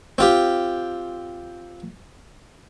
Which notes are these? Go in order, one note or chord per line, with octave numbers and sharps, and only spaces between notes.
C4 F4 G4